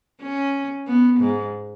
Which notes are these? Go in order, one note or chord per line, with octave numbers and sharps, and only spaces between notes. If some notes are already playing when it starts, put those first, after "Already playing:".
C#4
B3
G#2